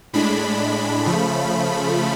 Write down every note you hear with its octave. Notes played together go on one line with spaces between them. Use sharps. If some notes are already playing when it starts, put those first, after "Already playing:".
A2 G#3 D4 B5
C#3 F3 A3